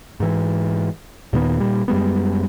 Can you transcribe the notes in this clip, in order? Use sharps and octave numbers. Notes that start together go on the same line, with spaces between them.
G#2 E3
D#2 A#2 D#3 B3
A#2 G3
F#2 G3 G#3 B3